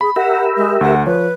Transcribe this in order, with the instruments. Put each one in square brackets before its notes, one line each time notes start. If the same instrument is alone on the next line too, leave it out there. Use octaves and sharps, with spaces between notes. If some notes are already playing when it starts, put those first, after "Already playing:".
[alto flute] G#4 [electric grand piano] B5
[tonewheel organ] G4 A#4 E5 [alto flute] F#5
[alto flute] G#3
[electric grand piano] D2 [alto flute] F#5
[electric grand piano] F3 C#5 [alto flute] B4